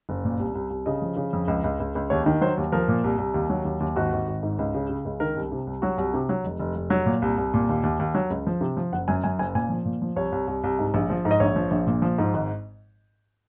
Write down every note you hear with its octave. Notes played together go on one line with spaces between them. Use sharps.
F#1
A#2
C2
C2
C2
C#3 D#5
F3
C#3
F2
C#2
C#2
C#2
C#2
D#2 C#5
D#3
F#3 C5
D#2
F3 A#4
A#2
C2
C2
D#2
F#3
D#2
D#2
G#1 F#4
G#1
G#1
G#2
C#2
C#3
C#3
C#2
D#3 A#4
C2
C3
C2
F#3 F#4
C2
C3
F#3
F1
F1
F1
F#3
A#2
C2
C2
A#2
D#2
D#2
D#2
F#3
C#2
F3
C3
F3
F#1 F#5
F#2 G#5
F#2 G#5
F#1 G#5
A#2 G#5
F3
A#2
F3
C2 C#5
C2
C2
C2
G#2
A#1
F3
G#2
D#5
A#1 C#5
F3
A#1
A#2
F3
G#2
G#1